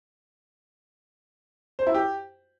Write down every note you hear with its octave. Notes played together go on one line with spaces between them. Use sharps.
C5
E4
G4